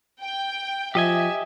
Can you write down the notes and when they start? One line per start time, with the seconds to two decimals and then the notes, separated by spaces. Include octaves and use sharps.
0.21 G5
0.95 F3 G4 D#5 E5 G#5